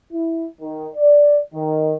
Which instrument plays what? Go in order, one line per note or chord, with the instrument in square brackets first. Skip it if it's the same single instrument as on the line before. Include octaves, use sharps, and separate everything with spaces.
[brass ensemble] E4
D#3
D5
D#3